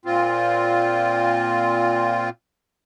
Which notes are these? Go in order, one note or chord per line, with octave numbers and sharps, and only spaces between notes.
A#2 C4 F4